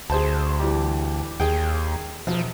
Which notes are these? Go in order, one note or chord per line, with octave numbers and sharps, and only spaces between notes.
D2 G#4 C5 A5
E3 G3 G4
D#2 G#4 G5
E1 F3